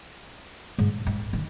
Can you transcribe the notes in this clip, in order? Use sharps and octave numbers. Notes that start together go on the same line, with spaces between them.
G#2
G#2
D#3